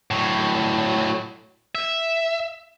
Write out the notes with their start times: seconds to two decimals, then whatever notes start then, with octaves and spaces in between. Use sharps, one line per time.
0.11 A2 F#3
1.75 E5